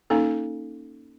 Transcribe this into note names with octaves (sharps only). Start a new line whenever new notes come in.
A#3 C#4 D#4 A4